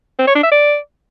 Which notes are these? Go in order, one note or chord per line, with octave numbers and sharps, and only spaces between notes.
C4
C#5
D4
E5
D5